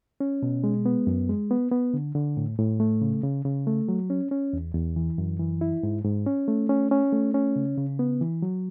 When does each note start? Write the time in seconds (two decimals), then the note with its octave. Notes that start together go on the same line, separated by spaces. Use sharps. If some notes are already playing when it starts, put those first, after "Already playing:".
0.20 C#4
0.43 B2
0.64 G#3
0.86 B3
1.07 F#2
1.29 G#3
1.51 B3
1.72 B3
1.94 D3
2.15 D3
2.37 A2
2.58 A2
2.80 A3
3.02 C#3
3.24 C#3
3.45 C#3
3.67 A3
3.88 F#3
4.10 C#4
4.31 C#4
4.53 E2
4.74 E2
4.96 E3
5.18 F#2
5.40 E3
5.61 E4
5.83 G#2
6.04 G#2
6.26 C#4
6.48 A3
6.69 C#4
6.91 C#4
7.12 A3
7.34 C#4
7.56 C#3
7.78 C#3
7.99 B3
8.21 E3
8.42 F#3